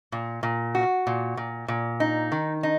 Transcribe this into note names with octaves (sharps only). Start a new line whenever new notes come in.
A#2
A#2
F#4
A#2
A#2
A#2
D#4
D#3
D#4